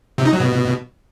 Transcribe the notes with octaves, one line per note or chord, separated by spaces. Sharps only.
C3
D#4
F#3
B2